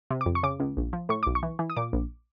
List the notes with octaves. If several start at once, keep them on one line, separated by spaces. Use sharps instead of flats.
C3
D6
F2
C#6
C#3 D6
C#2
A#1
F3
A2 C#6
B1 D6
C#6
E3
E3
D#6
A#2 D6
A#1